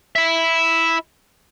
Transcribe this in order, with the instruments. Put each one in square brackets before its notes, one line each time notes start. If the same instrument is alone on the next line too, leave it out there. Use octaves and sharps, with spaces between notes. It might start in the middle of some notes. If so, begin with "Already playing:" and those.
[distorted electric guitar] E4 E5